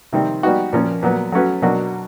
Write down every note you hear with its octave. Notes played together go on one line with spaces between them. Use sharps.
C3 D#3 G3 C4
G3 B3 D#4 F#4
A#2 F3 A#3 C#4
A#2 F#3 B3
F#3 A3 C#4 F#4 B4
B2 F#3 A#3 D4 F#4